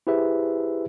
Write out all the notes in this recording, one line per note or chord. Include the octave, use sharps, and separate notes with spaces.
E4 G4 G#4 B4 C5 E5